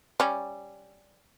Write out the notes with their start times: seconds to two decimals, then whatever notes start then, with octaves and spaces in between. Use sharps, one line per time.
0.20 G3 C#4